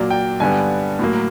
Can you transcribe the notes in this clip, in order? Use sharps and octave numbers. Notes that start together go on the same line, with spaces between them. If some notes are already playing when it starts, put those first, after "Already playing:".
Already playing: A#2 F#3 A#3 D5
G5
G2 D3 G3 B3 G#5
A2 F#3 A#3